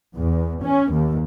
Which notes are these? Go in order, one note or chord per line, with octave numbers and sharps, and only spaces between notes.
E2
C#4
D#2